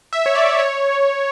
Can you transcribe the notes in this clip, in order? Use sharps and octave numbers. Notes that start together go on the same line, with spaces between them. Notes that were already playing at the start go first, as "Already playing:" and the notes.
E5
C#5
D5
C#5